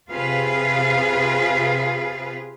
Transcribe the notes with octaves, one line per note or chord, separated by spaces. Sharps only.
C3 F4 G#4 B4 F5